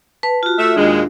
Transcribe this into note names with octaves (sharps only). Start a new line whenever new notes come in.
B4 A5
F4 F#4
A3 E5
D#2 A#2 G#3 D4